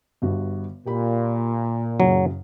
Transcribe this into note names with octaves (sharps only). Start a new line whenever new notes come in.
G1 G2 F#4
A#2 G4 B5
F#1 F#2 C#3 F#3